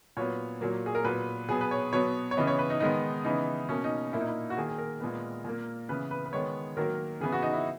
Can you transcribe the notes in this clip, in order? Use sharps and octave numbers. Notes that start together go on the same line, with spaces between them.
A#2 F#3 B3 C#5
A#2 F#3 A#3
G#4
A#4
A#2 F#3 B3 B4
B2 F#3 B3 G#4
B4
C#5
B2 F#3 B3 C#5
C#5
C#3 E3 B3 D#5
C#5
B4
D#4
D#3 G#3 B3 D#4
C#3 E3 B3 D#4
B2 A#3 C#4
D#4
A#2 A#3 E4
D#4
E4
F#4
D#3 A#3 G#4
G#4
A#4
A#2 G#3 B3
A#2 A#3
C#3 E3 B3 B4
B4
B4
D#3 G#3 B3 C#5
D#3 F#3 A#3 A#4
C#3 E3 B3 G#4
F#4
D#4
E4